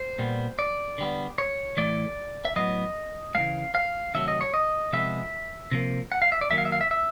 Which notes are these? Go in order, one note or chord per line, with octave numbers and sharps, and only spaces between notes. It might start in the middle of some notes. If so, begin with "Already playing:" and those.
Already playing: C5
A#2 G3 B3
D5
D3 G3 B3
C#5
A2 E3 A3 D5
E5
A2 F#3 B3 D#5
C#3 E3 A3 F5
F5
C3 D#3 F#3 A3 E5
D#5
C#5
D#5
C3 F3 G#3 B3 E5
C3 F3 A#3
F#5
F5
E5
D5
D#3 F#3 A#3 E5
F5
E5
F5
E5
E5